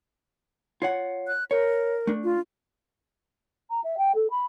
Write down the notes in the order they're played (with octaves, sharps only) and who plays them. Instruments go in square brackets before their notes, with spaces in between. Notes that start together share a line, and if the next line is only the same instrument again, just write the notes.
[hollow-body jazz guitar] F4 C#5 F#5
[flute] F#6
[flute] A#4 [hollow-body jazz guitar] C#5
[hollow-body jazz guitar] A3 D4
[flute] F4
[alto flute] A#5
E5
G5
A4
B5